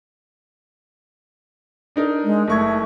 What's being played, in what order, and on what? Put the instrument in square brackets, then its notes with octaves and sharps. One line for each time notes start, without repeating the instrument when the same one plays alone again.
[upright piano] D4 D#4 A#4
[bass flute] G#3
[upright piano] F#1 C#6 G#6 [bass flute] A3